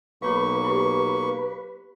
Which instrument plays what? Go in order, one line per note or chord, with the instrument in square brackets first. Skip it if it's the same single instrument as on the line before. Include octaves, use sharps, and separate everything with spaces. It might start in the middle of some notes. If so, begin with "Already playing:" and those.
[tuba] B1 [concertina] A#3 C#6 [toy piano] F#4 C#5 F5 [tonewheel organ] B4
[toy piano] E4 F4 G4